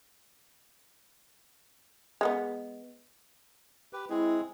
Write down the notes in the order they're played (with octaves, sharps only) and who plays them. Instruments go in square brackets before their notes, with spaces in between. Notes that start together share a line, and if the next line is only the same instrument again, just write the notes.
[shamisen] G#3 A3 B3
[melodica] G4 B4
[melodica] G#3 C4 G#4 [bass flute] E4